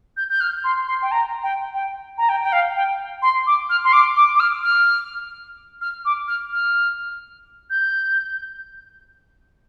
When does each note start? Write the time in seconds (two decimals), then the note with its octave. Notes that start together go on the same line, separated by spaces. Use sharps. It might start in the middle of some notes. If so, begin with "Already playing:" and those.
0.17 G6
0.30 G6
0.41 F6
0.64 C6
0.87 C6
1.02 G5
1.12 A#5
1.43 G5
1.74 G5
2.18 A#5
2.29 G5
2.43 G5
2.53 F5
2.76 G5
3.22 C6
3.47 D6
3.70 F6
3.84 C6
3.93 D6
4.16 D6
4.36 D6
4.40 F6
4.63 F6
5.81 F6
6.05 D6
6.28 F6
6.53 F6
7.70 G6